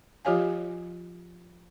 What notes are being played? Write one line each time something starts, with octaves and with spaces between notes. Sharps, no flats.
F3 F4 G4 C#5 F5 G#5